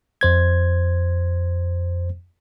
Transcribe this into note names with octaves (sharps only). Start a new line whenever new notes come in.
F2 C5 G#6